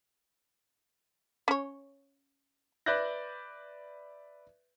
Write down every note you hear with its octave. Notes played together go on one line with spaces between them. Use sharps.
C#4 C#5
B4 D5 E5 F#6 G6 A#6